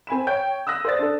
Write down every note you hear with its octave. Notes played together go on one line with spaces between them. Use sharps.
C4 G#5 B5 E7
C#5 G5 G6
D#6 E6 F#6 A#6
C5 D5 A6
D4 A4